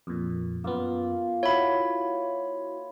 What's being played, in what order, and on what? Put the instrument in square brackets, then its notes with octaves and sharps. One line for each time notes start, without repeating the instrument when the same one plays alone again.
[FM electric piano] F2 A#2
[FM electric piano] F#2 B3 [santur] A#3 F4
[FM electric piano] E4 F#4 [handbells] C#5 B5